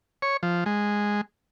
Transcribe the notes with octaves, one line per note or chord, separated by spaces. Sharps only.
C#5
F3
G#3